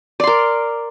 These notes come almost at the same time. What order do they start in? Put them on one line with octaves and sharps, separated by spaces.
D5 C6 A#4